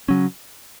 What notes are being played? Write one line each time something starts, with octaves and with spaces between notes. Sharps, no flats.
C#3 F#3 C#4